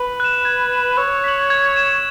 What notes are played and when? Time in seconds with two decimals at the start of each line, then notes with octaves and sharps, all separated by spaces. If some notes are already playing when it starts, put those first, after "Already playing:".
Already playing: B4
0.20 F#6 E7
0.45 G#6
0.72 E7
0.97 C#5 E6
1.24 B6 F#7
1.50 G#6
1.76 E7